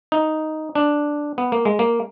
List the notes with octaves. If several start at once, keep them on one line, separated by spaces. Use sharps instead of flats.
D#4
D4
B3
A#3
G#3
A#3